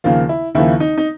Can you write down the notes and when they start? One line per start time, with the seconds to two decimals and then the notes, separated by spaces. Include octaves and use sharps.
0.04 D#2 C#3 F3 A#3 F4
0.29 E4
0.55 D#2 C#3 F3 A#3 E4
0.80 D#4
0.98 D#4